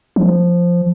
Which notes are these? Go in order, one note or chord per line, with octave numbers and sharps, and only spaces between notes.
F3